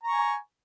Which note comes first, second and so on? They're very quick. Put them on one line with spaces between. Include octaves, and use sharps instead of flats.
A#5 C#6 G#5